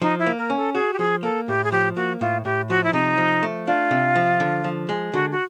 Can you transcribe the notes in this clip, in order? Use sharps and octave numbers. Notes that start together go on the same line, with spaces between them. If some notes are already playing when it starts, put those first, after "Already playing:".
F3 D#4
E4
A#3
A#4
C#4
A4
F#4 G#4
G4
F3 G#4
A#3 A4
A2 G4
G#4
F3 G4
A#3 F#4
A2 F4
A2 G4
F3 F#4
E4
C3 D#4
F3
A3
D4 F4
C3
F3
D3
F3
G#3
D3 F#4
F#4